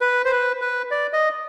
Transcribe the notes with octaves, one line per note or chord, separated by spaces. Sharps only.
B4
C5
B4
B4
D5
D#5